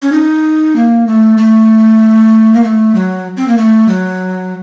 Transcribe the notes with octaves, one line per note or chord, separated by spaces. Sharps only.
C#4
D#4
A#3
A3
A3
A#3
A3
F#3
C4
A#3
A3
F#3